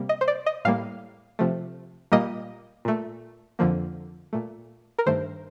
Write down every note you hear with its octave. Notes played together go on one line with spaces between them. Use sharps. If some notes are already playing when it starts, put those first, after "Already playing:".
Already playing: C3 G3 A#3
D#5
C5
D5
D#5
A2 G3 A#3 F5
C3 F3 A3
A#2 G3 A#3 D#5
A#2 A3
F2 D3 F3 A#3
A#2 A3
A#4
G2 D#3 A3 C5